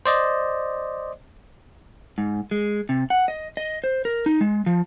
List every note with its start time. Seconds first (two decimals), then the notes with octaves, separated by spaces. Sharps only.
0.06 C5 D5 D#5
2.18 G#2
2.51 G#3
2.89 C3
3.10 F#5
3.28 D#5
3.57 D#5
3.84 C5
4.05 A#4
4.26 D#4
4.41 G#3
4.66 F3